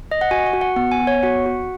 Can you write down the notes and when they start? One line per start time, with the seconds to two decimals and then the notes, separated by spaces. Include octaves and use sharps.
0.11 D#5
0.21 F#5
0.31 F#4 G#5
0.47 F#5
0.53 F#4
0.61 F#5
0.76 B3 F#5
0.92 G#5
1.00 B3
1.07 C#5
1.23 F#4 F#5
1.46 F#4